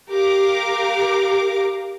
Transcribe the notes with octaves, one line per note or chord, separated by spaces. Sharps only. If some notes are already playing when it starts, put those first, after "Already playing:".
G4 A#4 F5 D6